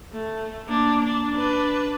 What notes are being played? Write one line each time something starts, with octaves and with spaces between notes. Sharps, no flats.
A3
A#3 D4
D4
D4 B4